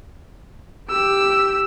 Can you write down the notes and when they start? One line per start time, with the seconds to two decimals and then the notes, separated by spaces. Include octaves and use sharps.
0.89 G4 E6